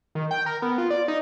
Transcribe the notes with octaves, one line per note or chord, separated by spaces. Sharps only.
D#3
G5
A#4
B3
F4
D5
D#4